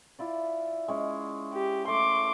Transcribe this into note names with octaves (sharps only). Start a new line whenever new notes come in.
E4 F4 D5
G#3 C#4
G4
A3 C6 D6